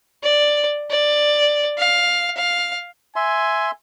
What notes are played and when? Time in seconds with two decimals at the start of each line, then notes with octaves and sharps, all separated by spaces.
0.23 D5
0.91 D5
1.78 F5
2.37 F5
3.16 E5 G#5 C6